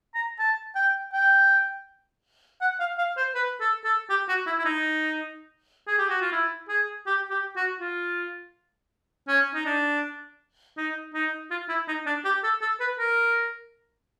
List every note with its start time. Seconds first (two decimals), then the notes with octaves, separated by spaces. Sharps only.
0.14 A#5
0.39 A5
0.75 G5
1.13 G5
2.61 F#5
2.80 F5
2.98 F5
3.17 C5
3.35 B4
3.60 A4
3.84 A4
4.10 G4
4.28 F#4
4.46 E4
4.59 E4
4.65 D#4
5.87 G#4
5.98 G4
6.09 F#4
6.21 F4
6.32 E4
6.69 G#4
7.06 G4
7.30 G4
7.56 F#4
7.80 F4
9.28 C#4
9.54 D#4
9.66 D4
10.77 D#4
11.14 D#4
11.51 F4
11.69 E4
11.88 D#4
12.06 D4
12.25 G4
12.43 A4
12.61 A4
12.80 B4
12.99 A#4